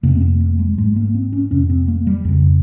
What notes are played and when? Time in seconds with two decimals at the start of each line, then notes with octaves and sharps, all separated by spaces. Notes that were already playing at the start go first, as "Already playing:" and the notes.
0.03 F2 C3 A#3
0.15 C4
0.22 A#3
0.40 A#3
0.59 G#3
0.78 G#2 G#3
0.96 A#3
1.14 C4
1.32 C#4
1.51 F2 C3 C#4
1.70 C4
1.88 A#3
2.07 G3
2.25 F2 C#3